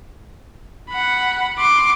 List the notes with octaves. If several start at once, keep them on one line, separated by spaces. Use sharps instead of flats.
F#5 B5
C6 D6